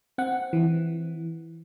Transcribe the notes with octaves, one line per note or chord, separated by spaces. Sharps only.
C4 F#5
E3